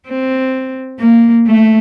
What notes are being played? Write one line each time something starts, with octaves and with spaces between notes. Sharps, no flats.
C4
A#3
A3